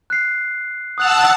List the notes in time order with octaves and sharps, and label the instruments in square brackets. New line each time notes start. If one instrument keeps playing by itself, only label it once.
[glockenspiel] F#6 C7
[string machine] F#5 A5 E6 [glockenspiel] D#6 F#6 F7